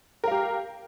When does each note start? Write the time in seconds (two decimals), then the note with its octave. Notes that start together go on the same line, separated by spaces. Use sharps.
0.24 A#4
0.27 F5
0.31 G4